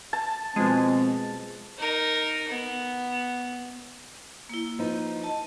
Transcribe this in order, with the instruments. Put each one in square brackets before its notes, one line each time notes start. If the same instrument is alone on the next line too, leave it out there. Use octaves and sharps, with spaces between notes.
[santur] A5
[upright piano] B2 F3 [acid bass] G#3 [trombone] C4
[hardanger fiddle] D#4 A#4
B3
[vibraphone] A#3 E4
[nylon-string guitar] F3 D#4 B4
[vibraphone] D#5 A5